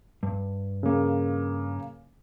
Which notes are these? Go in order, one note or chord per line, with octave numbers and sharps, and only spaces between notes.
G2
C#3 A#3